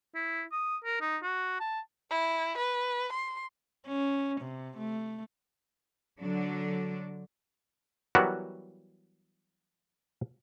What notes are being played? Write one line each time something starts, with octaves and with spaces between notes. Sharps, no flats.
E4
D#6
A#4
D#4
F#4
A5
E4
B4
C6
C#4
C3
A3
D3 F#3 D4
E3 F#3 G3 B3 F#4 A#4